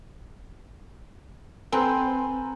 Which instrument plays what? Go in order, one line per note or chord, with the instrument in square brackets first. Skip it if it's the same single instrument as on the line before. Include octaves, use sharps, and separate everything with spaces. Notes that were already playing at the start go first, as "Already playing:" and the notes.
[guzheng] C4 [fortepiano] A4 B4 C5 [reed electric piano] G#5 A#5